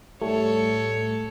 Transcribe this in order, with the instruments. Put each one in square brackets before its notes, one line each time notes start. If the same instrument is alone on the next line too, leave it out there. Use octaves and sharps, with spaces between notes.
[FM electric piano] A2 G3 A3 [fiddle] A4 C#5